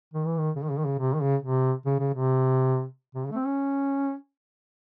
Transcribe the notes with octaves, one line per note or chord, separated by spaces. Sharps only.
D#3
E3
D#3
C#3
D#3
C#3
D#3
C#3
C3
D#3
C#3
C3
C#3
C#3
C3
C3
C#3
A3
C4
C#4